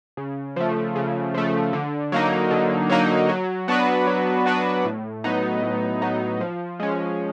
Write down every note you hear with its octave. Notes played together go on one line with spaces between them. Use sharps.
C#3
F3 A3
C#3
F3 A3
D3
F#3 A#3 D#4
D3
F#3 A#3 D#4
F#3
B3 D4 F#4 B4
F#3
B3 D4 F#4 B4
A2
F#3 B3 D#4
A2
F#3 B3 D#4
F3
G#3 C#4